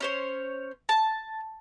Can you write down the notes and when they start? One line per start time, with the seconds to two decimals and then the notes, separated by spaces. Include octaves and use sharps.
0.01 C#4 C5 C#5
0.89 A5